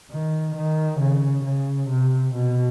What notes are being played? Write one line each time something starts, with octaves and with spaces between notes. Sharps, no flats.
D#3
D#3
C#3
C#3
C3
B2